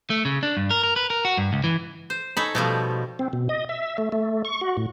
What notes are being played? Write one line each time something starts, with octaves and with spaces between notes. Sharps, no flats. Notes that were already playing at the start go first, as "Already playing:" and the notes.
A3
C#3
D4
G2
A#4
A#4
B4
A#4
F#4
G2
C#2
E3
C5
D#4 A4 C#5 B5
B2 F3 G3 A3
C4
B2
D#5
E5
A3
A3
C#6
F#4
A2